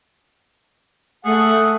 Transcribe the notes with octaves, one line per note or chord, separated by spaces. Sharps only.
A3 G#4 F#5